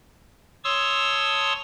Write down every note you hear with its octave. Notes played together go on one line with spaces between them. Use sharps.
C#5 A5 C6 C#6 D#6 E6